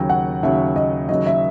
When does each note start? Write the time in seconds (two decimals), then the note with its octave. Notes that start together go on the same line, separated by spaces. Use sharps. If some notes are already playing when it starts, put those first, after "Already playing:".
Already playing: D#2 C#3 F#3 G5
0.09 F#5
0.43 D#2 C#3 F#3 E5
0.76 D#5
1.09 D#2 C#3 F#3 D#5
1.26 E5